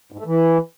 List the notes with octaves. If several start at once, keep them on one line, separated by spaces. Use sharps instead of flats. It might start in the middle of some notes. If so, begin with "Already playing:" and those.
G#2
A3
E3